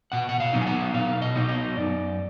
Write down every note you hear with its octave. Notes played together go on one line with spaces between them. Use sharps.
B2 F#5
F#5
F5
F#3 B3 D#4
G#5
F#5
B2 F5
D#5
F#3 B3 D#4
D#5
F#2 D5